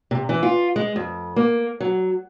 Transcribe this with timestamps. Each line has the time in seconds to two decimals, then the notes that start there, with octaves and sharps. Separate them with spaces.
0.11 C3
0.29 E3
0.43 F4
0.76 G#3
0.96 F2
1.36 A#3
1.80 F#3